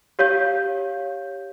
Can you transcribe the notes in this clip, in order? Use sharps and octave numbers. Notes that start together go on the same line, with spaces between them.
G4 C#5 F5 G6